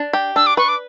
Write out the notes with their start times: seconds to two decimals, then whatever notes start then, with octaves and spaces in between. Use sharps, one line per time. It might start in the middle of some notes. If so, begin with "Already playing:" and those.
Already playing: D4
0.13 G4
0.36 D4 E6
0.47 D6
0.57 B4 C#6
0.69 D6